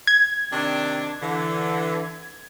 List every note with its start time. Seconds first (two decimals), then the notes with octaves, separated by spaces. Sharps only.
0.07 G#6
0.53 C3 D#3 D4
1.22 D3 E3